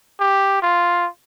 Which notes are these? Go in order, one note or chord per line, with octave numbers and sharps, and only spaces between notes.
G4
F4